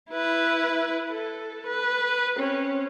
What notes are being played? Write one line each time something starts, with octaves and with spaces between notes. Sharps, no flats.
E4 B4
A4
B4
C4 C#4